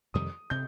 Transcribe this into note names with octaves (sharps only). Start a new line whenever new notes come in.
F2 C3 D#3 G3 D#6
C3 G6